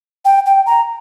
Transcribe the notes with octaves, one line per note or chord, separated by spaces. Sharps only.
G5
G5
A#5